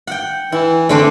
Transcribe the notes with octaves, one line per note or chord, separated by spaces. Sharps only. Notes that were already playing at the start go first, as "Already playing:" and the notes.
F#5 G5
E3 E4
D3 A3 C4 D4